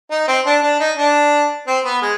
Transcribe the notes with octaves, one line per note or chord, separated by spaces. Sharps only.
D#4
C4
D4
D4
D#4
D4
C4
B3
G#3